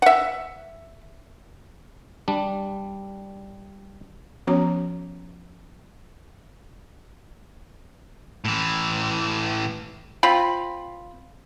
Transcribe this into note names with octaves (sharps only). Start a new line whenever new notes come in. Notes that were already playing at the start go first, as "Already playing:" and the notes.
E5 F#5
G3 D4
F3 B3 C#4 F#4 C#5 A#5
A2 E3
C4 F4 B5